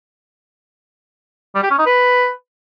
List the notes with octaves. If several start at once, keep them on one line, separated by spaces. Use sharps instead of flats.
G3
G4
C#4
D#4
B4